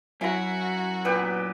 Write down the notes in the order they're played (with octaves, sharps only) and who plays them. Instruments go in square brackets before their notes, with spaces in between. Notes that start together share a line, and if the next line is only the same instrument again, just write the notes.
[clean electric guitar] F#2 [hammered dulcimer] E4 A#5 [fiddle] F#4
[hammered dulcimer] A#2 G4 B4 [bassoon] B3